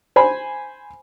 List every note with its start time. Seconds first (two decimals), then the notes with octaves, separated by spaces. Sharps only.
0.16 C5 G#5 B5